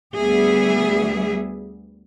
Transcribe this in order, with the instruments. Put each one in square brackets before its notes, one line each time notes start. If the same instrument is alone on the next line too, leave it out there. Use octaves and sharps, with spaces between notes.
[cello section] D2 G3 B3 G#4 E5